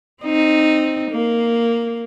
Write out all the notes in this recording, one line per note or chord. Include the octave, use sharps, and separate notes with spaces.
C4 D#4
A#3